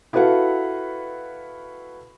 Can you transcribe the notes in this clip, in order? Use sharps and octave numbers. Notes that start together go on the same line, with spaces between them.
E4 F#4 A4 B4 F5 F#5